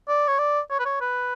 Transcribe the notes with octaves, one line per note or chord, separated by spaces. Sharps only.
D5
C#5
D5
C#5
B4
C#5
B4